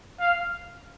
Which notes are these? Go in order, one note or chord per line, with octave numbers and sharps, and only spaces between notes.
F5